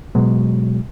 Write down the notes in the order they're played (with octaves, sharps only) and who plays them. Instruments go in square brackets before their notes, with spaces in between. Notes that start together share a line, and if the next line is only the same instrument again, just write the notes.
[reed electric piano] B2 F#3 G#3